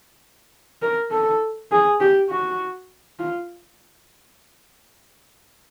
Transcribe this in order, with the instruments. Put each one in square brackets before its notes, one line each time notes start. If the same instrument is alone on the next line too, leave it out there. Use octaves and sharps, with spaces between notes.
[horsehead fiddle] A#4
A4
G#4
G4
F#4
F4